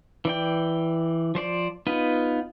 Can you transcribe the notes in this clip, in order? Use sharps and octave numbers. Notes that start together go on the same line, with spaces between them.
E3 D5 G5
F3 C5 D5
B3 D#4 F4 B4